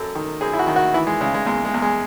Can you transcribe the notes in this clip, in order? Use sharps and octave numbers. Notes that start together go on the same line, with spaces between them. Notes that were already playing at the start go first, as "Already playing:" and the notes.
Already playing: F#2 A4
D#3
F#2 G#4
E4
F#4
D#3
F#4
E3 E4
G#3
C#3 G#3
G#3
E2 G#3
G#3
E2
G#3